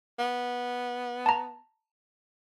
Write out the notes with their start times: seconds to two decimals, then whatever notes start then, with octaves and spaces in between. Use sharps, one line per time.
0.19 B3
1.26 A5 A#5